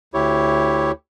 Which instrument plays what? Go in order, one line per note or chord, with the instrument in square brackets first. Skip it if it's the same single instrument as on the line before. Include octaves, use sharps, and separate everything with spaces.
[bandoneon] D2 E4 G4 C#5